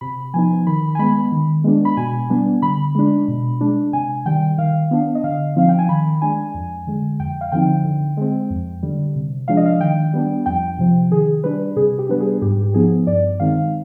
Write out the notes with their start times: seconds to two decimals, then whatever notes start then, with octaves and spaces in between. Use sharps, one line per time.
0.01 C3 B5
0.34 F3 B3 D#4 G#5
0.67 D#3 B5
0.95 G#5
0.99 G#3 B3 B5
1.32 D#3
1.64 G#3 B3 D4
1.85 B5
1.97 B2 G#5
2.30 G3 B3 D4
2.62 D3 B5
2.95 G#3 D4
3.28 B2
3.61 G#3 D4
3.93 C3 G#5
4.26 D#3 G3 G5
4.58 D#3 F5
4.91 B3 D4
5.15 D#5
5.24 D3 F5
5.56 F3 C4 D#4 F5
5.69 G5
5.79 G#5
5.89 D#3 B5
6.22 G#3 D4 G#5
6.54 F2
6.87 D3 G#3
7.20 F2 G5
7.41 F5
7.52 D3 F3 C4 D#4 G5
7.85 D3
8.17 G#3 C4
8.50 F2
8.83 D3 G3
9.15 C3
9.48 F3 G#3 D4 F5
9.57 D#5
9.66 F5
9.80 D#3 G5
10.13 G3 B3 D4
10.46 F2 G5
10.79 C3 F3
11.11 D#3 G#4
11.44 G3 D4 B4
11.77 C3 G#4
11.99 G4
12.09 G3 B3 D4 B4
12.20 G#4
12.42 G#2 G4
12.63 G4
12.74 F3 B3 D#4 G#4
13.07 G2 D5
13.40 D#3 G#3 C4 D#4 F5